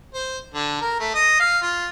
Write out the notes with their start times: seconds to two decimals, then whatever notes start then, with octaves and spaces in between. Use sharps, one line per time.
0.14 C5
0.54 D3
0.81 A#4
1.00 A3
1.15 D#5
1.40 F5
1.62 F4